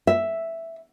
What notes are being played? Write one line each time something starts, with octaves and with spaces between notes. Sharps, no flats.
E5